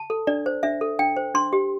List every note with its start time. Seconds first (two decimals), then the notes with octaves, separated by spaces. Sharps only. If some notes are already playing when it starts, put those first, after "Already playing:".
Already playing: A5
0.10 A4
0.27 D4 D5
0.46 C5
0.63 D4 E5
0.81 A4
0.99 D4 G5
1.17 C5
1.35 D4 C6
1.53 G4